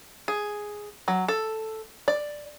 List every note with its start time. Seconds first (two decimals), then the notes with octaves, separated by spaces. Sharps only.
0.28 G#4
1.08 F#3
1.28 A4
2.08 D5